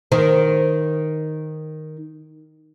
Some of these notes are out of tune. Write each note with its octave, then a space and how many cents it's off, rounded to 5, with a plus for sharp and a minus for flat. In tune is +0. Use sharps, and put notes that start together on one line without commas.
D#3 +0 C5 +5